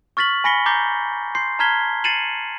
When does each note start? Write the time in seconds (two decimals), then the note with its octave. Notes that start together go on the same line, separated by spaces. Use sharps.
0.17 C#6 F6 A6 B6 F#7
0.44 G#5 B5 A#6 B6 C#7 G7
0.66 A#5 D6 G6 A6 C7 G7
1.35 C6 G6 C7
1.59 A5 A#5 F6 G#6 B6 G7
2.04 A6 C7 C#7 D#7 E7 F#7